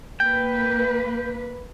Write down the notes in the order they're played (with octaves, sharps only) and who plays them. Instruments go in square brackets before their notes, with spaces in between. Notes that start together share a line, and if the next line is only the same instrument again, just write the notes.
[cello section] A#3 B4 [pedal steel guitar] G5